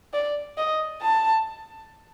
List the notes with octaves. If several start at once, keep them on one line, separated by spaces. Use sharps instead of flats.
D5
D#5
A5